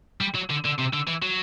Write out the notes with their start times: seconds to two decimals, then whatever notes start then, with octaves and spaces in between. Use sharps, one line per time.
0.21 G3
0.35 F#3
0.50 D3
0.65 D3
0.78 C3
0.93 D3
1.07 E3
1.22 F#3